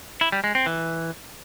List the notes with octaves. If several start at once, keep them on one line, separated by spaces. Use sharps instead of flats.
E4
G3
G#3
C4
E3